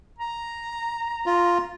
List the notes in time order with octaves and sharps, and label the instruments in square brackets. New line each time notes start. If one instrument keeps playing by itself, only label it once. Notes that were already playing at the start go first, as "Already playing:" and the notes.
[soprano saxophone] A#5
[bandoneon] F4